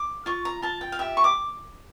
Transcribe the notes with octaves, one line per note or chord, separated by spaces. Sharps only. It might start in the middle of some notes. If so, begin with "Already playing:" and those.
Already playing: D6
F4 C#6
A#5
F4 A5
G5
F5
G4 E5
C#6
D6